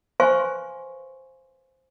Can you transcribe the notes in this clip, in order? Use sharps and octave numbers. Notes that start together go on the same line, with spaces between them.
B4 C5 F5 G#5 C6 C#6